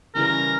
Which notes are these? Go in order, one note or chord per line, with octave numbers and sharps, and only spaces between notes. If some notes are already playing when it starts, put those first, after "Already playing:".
C#3 E3 G3 C#4 A#4